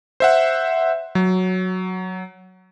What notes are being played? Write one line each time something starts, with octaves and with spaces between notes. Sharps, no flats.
C5 E5 F#5
F#3